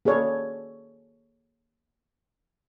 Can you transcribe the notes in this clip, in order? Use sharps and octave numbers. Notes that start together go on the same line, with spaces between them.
A#3 G#4 A4 C#5 D5